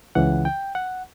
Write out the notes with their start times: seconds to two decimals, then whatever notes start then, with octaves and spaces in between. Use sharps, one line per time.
0.15 C#2 C#3 E3 F#5
0.45 G5
0.75 F#5